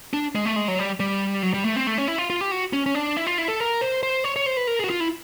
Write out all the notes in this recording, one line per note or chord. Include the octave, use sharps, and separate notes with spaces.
D4
G#3
A3
G#3
F#3
G3
G3
F#3
G3
A3
C4
A3
C#4
E4
F4
F4
G4
F#4
C#4
C#4
D4
E4
F4
E4
A4
A#4
C5
C5
C#5
C#5
C5
B4
A#4
F#4 G#4
F4
E4